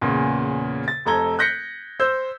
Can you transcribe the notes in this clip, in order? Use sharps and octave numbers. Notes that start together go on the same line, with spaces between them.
E2 A#2 C#3
A6
F1 F2 A4 A#5 G#6 G7
F#6 G6 A#6 B6 C#7
C5 E6 G6